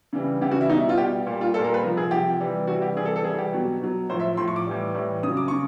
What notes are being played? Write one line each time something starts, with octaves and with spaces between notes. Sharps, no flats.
C#3 E3 G3
C#3 E3 G3 G4
F#4
E4
B2 G3 D#4
E4
F4
B2 G3 G4
A#2 G3
F4
A#2 G3 A4
A#4
B4
C3 F3 A#4
G#4
C3 F3 G4
C3 E3 G3
C3 E3 G3 F#4
G4
C3 E3 G3 G#4
A4
A4
C3 E3 G3 G#4
G4
B2 F#3
B2 F#3
A2 F3 C5
E5
A2 F3 C6
C#6
D6
A2 E3 G3
A2 E3 G3
C#3 F#3 D#6
D6
C#3 C#6